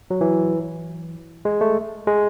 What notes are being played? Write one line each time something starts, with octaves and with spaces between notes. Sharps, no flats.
F#3
E3
G#3
A3
G#3